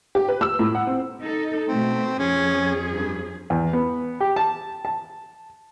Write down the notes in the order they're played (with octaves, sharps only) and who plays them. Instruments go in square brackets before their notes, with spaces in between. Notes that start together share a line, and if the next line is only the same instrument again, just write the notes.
[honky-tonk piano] G4
B4
E6
A2
F#5
C4
[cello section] D#4 A4
[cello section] B2 A3 [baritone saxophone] C4
[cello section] F2 G#4 [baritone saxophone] C#4
[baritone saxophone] G2
[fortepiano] E2
B3
G4
A5
A5